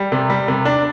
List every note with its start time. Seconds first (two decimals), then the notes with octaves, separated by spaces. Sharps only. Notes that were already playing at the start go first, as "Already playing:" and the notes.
Already playing: G3
0.12 C3
0.30 G3
0.48 C3
0.65 D4